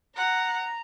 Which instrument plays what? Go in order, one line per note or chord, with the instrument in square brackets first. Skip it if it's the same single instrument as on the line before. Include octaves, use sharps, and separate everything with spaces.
[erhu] F#5 [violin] A#5